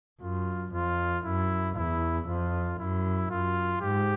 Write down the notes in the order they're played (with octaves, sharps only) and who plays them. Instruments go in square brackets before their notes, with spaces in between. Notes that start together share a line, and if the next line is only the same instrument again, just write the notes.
[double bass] F#2 [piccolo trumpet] F4
[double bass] F2 [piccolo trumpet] F4
[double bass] F#2 [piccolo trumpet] E4
[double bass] E2 [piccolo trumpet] E4
[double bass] F2 [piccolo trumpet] F4
[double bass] F#2 [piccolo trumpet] E4
[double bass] F#2 [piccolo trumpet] F4
[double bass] G#2 [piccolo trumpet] G4